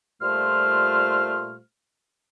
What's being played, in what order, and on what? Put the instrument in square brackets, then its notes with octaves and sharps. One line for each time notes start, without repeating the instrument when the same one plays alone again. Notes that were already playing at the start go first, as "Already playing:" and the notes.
[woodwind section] A#2 G3 A3 F4 C5 F6